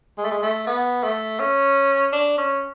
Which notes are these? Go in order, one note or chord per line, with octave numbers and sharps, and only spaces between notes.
G#3
A3
G#3
A3
B3
A3
C#4
D4
C#4